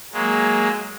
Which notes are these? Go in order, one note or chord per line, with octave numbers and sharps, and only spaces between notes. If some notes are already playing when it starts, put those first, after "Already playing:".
F#3 G#3 A#3